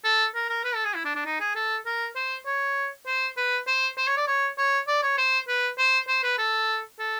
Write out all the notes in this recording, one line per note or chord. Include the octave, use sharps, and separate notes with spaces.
A4
A#4
A#4
B4
A4
G#4
E4
D4
D4
D#4
G#4
A4
A#4
C5
C#5
C5
B4
C5
C5
C#5
D5
C#5
C#5
D5
C#5
C5
B4
C5
C5
B4
A4
A4